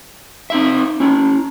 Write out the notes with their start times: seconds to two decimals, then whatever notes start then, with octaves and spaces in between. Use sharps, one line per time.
0.50 C4 D#4 E5
1.00 C#4 E4